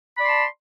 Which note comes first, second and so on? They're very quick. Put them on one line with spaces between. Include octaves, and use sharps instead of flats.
B5 D5 C6 A5